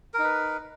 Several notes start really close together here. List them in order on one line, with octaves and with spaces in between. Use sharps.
A#4 D#4 B4